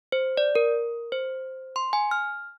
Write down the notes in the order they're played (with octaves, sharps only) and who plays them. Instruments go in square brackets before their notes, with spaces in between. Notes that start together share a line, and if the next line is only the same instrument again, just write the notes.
[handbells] C5
D5
A#4
C5
C6
G#5
F6